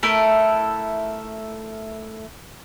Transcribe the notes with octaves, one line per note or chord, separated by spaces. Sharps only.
A3 E4 A4 A#4